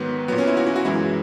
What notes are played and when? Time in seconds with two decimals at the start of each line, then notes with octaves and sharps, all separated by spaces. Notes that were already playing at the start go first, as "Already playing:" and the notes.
Already playing: G#2 D#3 F#3 B3
0.28 A#2 F#3 B3
0.38 C#4
0.47 E4
0.57 F#4
0.67 E4
0.76 F#4
0.85 F#2 E3 G#3 E4